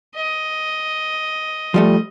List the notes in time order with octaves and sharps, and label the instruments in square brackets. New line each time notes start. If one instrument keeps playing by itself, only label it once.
[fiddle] D#5
[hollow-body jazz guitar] F3 G3 A3